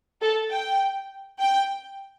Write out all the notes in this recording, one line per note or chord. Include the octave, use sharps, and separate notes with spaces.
A4
G5
G5